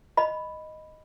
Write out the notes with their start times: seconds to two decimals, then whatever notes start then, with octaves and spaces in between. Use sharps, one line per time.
0.17 D#5 B5